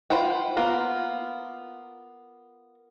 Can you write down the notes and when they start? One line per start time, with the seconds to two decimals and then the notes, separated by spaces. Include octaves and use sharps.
0.10 F4 B4 C5 F#5 G5
0.57 A#3 B3 F4